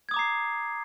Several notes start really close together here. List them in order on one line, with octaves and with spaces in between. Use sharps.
G#6 D#6 D6 A#5 C7